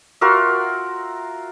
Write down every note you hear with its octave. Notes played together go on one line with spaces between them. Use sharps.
F4 F#4 A#4 E5